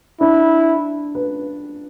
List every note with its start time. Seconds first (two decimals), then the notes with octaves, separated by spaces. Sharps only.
0.21 D4 E4
1.15 B4